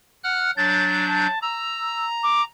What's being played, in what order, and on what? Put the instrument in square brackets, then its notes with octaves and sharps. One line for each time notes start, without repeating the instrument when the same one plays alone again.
[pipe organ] F#5 F6 F#6
[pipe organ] F#3 D4 G6 [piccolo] A6
[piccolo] A5
[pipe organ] A#5 [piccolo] E6
[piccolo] D6